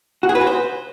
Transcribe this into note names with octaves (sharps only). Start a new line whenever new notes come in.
F#4
G#4
B4
F#4
C5